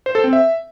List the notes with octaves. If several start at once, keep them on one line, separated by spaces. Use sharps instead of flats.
C5
A4
C4
E5